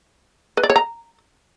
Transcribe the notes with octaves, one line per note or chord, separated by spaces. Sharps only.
B4
D5
C#5
A#5